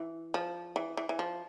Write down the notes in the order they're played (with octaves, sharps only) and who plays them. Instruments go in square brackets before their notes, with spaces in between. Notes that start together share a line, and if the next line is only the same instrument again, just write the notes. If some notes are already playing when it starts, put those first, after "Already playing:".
Already playing: [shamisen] E3
F3
E3
E3
E3
F3